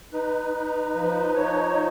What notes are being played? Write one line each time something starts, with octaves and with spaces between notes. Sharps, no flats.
D#4 B4
D#4 B4
F3 B4
D#4 C#5